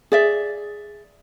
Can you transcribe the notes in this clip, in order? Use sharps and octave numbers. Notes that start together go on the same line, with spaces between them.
G#4 D5 E5